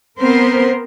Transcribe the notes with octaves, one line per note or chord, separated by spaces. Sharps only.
B3 C4 A#4 C5